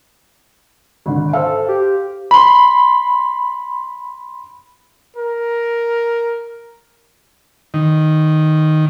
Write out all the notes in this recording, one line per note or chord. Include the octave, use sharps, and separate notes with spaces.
G#1 D3
A4 C5 F5
G4
B5 C6
A#4
D#3